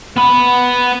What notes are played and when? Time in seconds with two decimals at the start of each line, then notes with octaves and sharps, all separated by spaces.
0.17 B3 B5